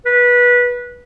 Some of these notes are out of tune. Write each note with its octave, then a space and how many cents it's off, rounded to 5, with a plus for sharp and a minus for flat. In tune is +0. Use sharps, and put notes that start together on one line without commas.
B4 -20